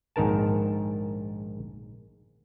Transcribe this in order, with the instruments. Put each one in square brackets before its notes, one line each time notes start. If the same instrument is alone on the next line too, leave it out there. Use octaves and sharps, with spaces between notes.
[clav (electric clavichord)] A#1 G#2 D#3 A#4 A5